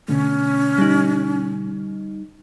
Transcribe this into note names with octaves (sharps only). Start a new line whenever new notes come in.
B2 D3 A3 C#4
G3 D#4